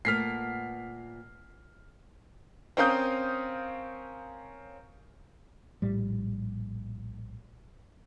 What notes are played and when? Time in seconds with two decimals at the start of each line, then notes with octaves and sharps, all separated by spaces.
0.05 A#2 A3 B3 F6 B6 C7
2.77 C4 C#4 A#4 F5 D#6 G6
5.82 A#1 A2 G3